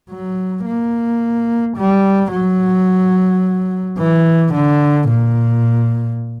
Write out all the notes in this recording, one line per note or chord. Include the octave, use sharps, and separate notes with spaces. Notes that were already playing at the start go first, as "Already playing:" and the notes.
F#3
A#3
G3
F#3
E3
D3
A#2